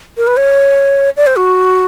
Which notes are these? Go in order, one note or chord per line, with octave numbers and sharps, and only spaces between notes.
A#4
B4
C#5
D5
C5
F#4